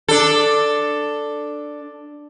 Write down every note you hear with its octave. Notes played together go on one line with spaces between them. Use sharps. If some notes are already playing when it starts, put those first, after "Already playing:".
D4 A4